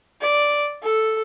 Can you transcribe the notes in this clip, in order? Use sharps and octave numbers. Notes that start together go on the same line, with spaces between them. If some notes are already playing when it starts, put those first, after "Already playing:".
D5
A4